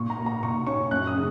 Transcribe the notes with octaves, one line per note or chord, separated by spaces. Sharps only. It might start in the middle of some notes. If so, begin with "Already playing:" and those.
Already playing: A#2 C#6
A#5
A#3
A#5
A#2 C#6
C#4 C#6
F#2 F#6
D#6
C#3